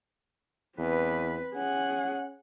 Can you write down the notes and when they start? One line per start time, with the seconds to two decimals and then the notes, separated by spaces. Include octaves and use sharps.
0.78 E2 C4 B4
1.55 C#4 G#4 F#5